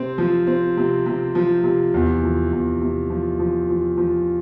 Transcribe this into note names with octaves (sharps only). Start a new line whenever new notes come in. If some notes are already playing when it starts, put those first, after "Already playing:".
Already playing: C3 C4
F3
C4
C3
C3
F3
C3
E2
F3
E2
C3
F3
F3
F3
F3